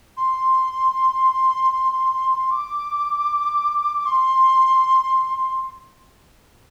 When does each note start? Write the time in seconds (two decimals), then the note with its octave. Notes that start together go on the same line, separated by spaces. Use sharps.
0.17 C6
2.51 D6
4.06 C6